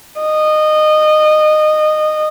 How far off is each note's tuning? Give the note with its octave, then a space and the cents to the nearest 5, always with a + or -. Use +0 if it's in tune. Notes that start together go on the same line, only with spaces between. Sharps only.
D#5 -20